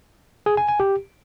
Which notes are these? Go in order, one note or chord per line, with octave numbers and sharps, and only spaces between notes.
G#4
G#5
G#5
G4